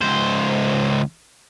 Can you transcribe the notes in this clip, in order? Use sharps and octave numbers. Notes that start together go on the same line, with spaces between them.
C#2 C5